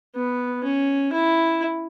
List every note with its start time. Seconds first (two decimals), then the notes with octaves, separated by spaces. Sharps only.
0.16 B3
0.64 C#4
1.12 E4